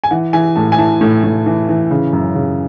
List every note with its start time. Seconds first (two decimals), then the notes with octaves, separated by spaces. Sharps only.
0.04 G#5
0.11 E3 F#5
0.33 E3 G#5
0.56 A2 A5
0.72 G#5
0.78 E3 A5
1.01 A2
1.24 A2
1.46 E3
1.69 E3
1.91 C#3
2.13 F#2
2.35 C#3